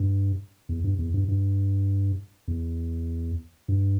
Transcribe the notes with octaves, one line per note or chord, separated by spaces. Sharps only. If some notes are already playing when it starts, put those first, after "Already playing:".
Already playing: G2
E2
G2
E2
G2
G2
E2
G2